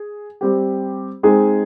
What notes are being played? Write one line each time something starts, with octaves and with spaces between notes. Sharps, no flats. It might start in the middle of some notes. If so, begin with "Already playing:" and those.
Already playing: G#4
G3 C4 G4
G#3 C4 D#4 G#4